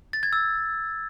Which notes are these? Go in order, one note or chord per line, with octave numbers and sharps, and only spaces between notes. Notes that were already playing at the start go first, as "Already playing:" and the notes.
A6
G#6
E6